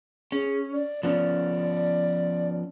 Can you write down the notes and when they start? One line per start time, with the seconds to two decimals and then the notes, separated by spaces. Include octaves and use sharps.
0.32 C#4 G#4
0.73 D5
1.03 F3 B3 C#4 D5